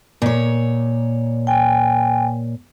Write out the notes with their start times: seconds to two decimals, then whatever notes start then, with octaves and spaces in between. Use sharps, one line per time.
0.22 A#2 C#5
1.47 G5 G#5